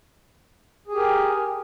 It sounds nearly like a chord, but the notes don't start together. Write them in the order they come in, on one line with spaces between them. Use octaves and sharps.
G#4 G4 A#4